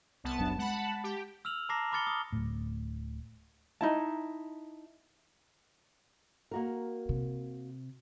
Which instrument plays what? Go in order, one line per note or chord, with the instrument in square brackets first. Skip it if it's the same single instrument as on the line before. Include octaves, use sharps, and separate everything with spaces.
[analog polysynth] C2 B3 A5
[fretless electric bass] F#1 F#3 D4
[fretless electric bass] G#3 [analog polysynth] F#5 A5 B5
[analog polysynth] G4
[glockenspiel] E6 F6 F7 F#7
A5 A#5 D6 A#6 C7
B5 D6 F6 A6 C#7 G7
D#6
[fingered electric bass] D1 A2
[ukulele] D#4 E4 A5
[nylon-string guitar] A#3 F#4 A#4
[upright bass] C3